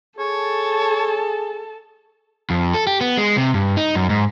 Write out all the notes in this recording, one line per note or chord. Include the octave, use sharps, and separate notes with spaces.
G#4 A4 C#5 A5
F2
A4
G4
B3
G#3
C3
G2
D#4
F#2
G#2